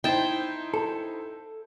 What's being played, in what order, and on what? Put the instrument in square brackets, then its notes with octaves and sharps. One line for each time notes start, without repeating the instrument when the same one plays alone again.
[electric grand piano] D#4 E4 C5 [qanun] G5 A5
[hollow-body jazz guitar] A4